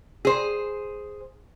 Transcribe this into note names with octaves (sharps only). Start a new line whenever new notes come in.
G#4 C5